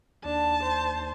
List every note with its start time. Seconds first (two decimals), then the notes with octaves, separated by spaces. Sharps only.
0.25 D#2 D4 A5
0.63 C5